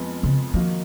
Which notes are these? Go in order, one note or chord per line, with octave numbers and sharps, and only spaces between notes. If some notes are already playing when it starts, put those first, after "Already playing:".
Already playing: F2 F3 G#3 B3
C#3
D#3 F3 A#3 D#4 F#4